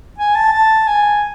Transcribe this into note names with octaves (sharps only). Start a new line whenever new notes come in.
G#5
A5
A5
G#5